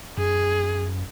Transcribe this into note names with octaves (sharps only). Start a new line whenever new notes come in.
F#2 G#4